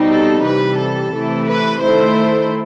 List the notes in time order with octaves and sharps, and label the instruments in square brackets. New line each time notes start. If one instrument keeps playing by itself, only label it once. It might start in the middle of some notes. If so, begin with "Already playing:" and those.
Already playing: [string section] B2 G3 C4 D#4
A4
C3 E3 G3 B4
A4
C3 E3 A3 E4
B4
D#3 A3 E4 C5